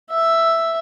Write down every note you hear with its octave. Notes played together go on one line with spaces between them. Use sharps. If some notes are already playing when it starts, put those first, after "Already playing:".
E5